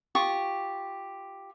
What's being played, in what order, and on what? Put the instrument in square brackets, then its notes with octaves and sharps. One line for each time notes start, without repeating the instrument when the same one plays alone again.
[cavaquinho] F4 G4 C#6 D#6